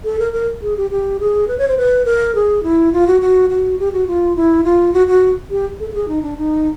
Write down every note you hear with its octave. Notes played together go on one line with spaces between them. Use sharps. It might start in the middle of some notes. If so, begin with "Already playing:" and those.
A4
A#4
A#4
G#4
G4
G4
G#4
B4
C#5
C5
B4
A#4
G#4
E4
F4
F#4
F#4
F#4
G4
F#4
F4
E4
F4
F#4
F#4
G4
A4
A4
G#4
D#4
D4
D#4